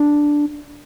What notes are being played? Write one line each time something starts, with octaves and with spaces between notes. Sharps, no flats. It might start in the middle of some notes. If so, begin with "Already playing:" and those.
Already playing: D4